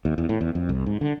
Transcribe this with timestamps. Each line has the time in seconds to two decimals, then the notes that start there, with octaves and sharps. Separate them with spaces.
0.05 D#2
0.18 E2
0.29 A2
0.41 E2
0.55 F2
0.69 C2
0.86 G#2
1.01 D3